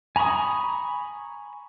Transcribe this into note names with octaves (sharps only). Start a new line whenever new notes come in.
G#5 A#5 B5 C#6 D#6